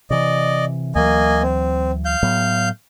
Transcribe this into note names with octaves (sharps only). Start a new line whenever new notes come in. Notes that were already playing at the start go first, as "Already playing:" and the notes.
C3 E3 D5 D#5
D2 E3 F#3 A#3 D#5 G#5
C4
F5 G6
A2 F#3 B3